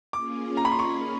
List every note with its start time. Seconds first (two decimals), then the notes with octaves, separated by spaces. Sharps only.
0.13 A#3 C#4 F4 G#4 D6
0.57 A#5
0.65 B5
0.72 C6
0.79 C#6